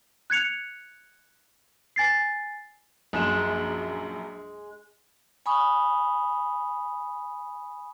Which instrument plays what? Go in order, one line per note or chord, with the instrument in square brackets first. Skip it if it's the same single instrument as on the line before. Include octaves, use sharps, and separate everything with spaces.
[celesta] F#6 G#6 C#7 F7
G#5 A6 C7
[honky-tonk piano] A#1 F#2 E7 [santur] G#3
[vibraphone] G#5 B5 C#6 D#6